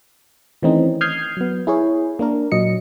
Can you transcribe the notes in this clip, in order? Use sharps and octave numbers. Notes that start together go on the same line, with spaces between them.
D#3 E3 A3 C4 C#4 D#4
D#6 F6 G6 G#6 C7
F#3 B3
E4 G#4 C#5
A#3 D4 A#4
A#2 F#3 D#5 C#7